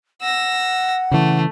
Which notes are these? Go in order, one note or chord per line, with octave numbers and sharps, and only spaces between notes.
F#5 E6 A#6
C#3 E3 A3